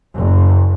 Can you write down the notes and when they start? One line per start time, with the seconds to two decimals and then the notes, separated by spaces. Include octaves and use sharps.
0.14 F#1